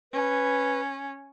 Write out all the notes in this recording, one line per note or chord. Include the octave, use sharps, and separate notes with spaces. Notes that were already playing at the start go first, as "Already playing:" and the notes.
C#4 B4